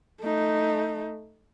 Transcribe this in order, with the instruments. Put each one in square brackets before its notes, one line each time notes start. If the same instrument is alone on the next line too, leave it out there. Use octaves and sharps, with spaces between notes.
[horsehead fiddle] A3 D#4